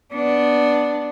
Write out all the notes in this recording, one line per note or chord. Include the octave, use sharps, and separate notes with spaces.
B3 D4